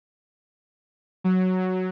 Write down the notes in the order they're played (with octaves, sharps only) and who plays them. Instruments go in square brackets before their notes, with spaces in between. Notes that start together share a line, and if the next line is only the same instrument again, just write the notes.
[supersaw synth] F#3